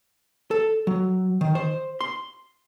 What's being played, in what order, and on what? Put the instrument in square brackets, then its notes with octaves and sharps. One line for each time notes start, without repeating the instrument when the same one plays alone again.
[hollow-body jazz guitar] A4
F#3
D#3
C5
C6